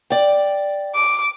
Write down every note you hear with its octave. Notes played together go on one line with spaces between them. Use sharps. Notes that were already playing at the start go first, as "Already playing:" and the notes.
D5 G5
D6